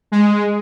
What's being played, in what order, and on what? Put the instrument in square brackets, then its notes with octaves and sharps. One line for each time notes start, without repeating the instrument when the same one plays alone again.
[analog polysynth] G#3